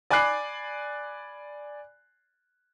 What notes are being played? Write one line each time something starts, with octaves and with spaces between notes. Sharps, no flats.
D5 G#5 B5 D6 F#6 C7